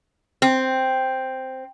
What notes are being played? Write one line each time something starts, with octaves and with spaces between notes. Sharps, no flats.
C4